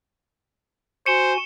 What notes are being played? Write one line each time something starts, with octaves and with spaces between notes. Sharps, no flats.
F#4 C5 G#5 C#7 E7 G7